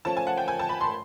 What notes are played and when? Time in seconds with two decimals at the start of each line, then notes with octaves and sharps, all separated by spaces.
0.05 F3 A3 C#4 A5
0.17 G#5
0.27 F#5
0.37 G5
0.48 G#5
0.59 A5
0.69 B5
0.81 C6